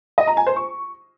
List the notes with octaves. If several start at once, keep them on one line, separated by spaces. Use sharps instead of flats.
D#5
A#5
G#5
C5
C#6